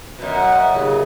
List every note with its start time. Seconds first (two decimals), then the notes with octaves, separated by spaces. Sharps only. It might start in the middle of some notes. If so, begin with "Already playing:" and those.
0.19 F#2 B2
0.34 F#5
0.73 D#2 A#2 C#3